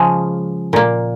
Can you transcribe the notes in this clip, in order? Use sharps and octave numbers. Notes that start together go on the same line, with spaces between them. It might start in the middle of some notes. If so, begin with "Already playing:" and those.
Already playing: C#3 F3 G#3 G#5
A#2 A#3